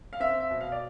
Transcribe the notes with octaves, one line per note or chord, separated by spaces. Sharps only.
F5
C4 E5
E5
B2
F5
D5